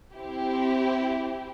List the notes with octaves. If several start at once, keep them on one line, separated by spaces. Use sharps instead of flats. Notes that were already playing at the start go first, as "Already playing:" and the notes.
C4 E4 G4